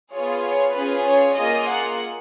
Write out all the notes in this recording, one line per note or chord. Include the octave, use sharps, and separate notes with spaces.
B3 F4 G#4 C#5
C#5
C#4 F4 G#4 B4
C#5
A#3 F4 G#4 D#5
F#5